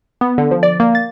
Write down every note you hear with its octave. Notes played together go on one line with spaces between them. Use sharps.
B3
D3
F3
D5
A#3
A6